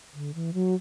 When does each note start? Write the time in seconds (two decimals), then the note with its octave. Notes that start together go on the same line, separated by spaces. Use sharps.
0.14 D3
0.35 E3
0.54 F#3